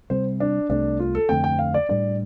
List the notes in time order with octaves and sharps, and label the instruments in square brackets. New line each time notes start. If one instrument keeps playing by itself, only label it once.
[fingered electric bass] C3 G3 C4 [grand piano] C5
[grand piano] D4
[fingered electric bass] C2 C3 A3 [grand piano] D4
[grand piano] F4
A4
[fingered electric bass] F2 D3 A3 C4 [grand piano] G5
[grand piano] G5
F5
D5
[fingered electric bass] A2 G3 D4 [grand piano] D5